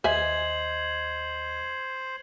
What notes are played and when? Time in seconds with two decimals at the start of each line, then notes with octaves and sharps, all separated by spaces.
0.04 D#2 B4 C5 D#5 E5 G#5 G#6 F#7